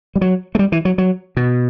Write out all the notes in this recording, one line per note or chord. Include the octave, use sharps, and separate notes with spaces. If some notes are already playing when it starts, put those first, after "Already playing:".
G3
F#3
A3
G3
E3
F#3
F#3
B2